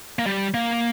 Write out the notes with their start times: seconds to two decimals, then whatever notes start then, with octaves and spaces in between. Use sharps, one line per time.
0.19 A#3
0.26 G3
0.54 A#3